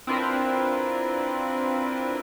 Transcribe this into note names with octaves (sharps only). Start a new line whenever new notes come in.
C4 D4 E4 F4 A#4 B4